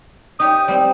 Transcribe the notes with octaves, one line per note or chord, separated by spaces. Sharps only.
D#4 G4 C#5 D#6
G3 C4